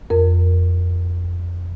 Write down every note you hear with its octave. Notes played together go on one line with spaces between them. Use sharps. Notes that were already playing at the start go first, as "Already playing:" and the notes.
F2 A#4